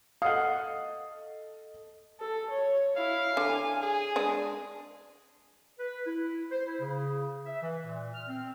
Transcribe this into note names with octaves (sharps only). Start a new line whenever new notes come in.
A4 D#5 F5 F#5 D#6
A4
C#5
E4 F5
D3 G#5
G#4
G#3 D4
B4
E4
C5
E4
C#3
E5
E3
A#2
F6
C4